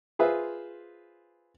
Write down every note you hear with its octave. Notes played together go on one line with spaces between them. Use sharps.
F4 G#4 B4 C5 E5